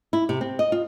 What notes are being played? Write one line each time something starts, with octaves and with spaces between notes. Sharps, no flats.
E4
C3
C4
D#5
F4